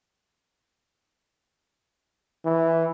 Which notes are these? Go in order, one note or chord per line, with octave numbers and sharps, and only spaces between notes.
E3